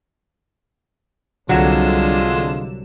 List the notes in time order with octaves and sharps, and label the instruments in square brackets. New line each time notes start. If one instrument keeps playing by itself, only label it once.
[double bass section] C2 [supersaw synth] D3 E7 [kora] F#3 [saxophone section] G#3 F4